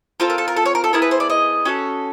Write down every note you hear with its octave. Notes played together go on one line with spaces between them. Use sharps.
C4 F4 A4 A#4
A#4
A4
A#4
A4
C#5
A#4
A4
B3 E4 G#4 A#4
B4
C5
D5
D#5
C#4 F#4 A4